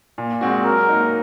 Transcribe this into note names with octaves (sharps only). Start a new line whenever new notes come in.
A#2
G#3 C4 F#4
F#3 A#4
A#3 D#4